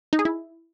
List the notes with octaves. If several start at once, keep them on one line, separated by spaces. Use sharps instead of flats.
D#4
G#4
E4